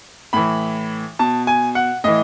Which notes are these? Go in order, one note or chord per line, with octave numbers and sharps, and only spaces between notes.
A2 E3 B5
B2 A5
G#5
F#5
A2 E3 D#5